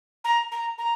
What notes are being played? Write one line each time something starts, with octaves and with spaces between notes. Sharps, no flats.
A#5
A#5
A#5